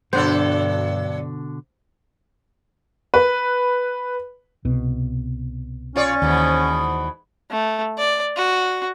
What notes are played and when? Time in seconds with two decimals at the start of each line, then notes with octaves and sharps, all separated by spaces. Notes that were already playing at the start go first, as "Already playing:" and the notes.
0.13 G2 B2 D3 F#3 D4 A4 C5 F#5
3.14 B4
4.65 C2 B2
5.96 C#4 F4 C#5 D5
6.22 D#2 G#2 B2 E3
7.51 A3
7.98 D5
8.36 F#4